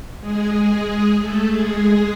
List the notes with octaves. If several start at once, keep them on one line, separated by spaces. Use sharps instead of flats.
G#3 G#4
G#3 G#4
A3 A4
G#3 G#4